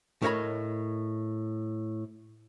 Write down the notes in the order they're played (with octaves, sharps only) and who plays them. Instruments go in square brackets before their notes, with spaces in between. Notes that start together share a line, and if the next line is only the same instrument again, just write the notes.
[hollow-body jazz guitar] A2 A#4 C#5 D#5 B5